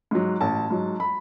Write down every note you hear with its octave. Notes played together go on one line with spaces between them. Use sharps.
G#2 F#3
A1 A5
G#2 F#3
B5